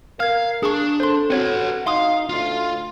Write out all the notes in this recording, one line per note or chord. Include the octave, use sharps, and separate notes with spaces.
A#4 F5 F6 G#6
D4 G#4 C#6
A4 C5 C6
C4 F#4 A4 B4 C#5
D#4 F5 C6 D#6
D2 F4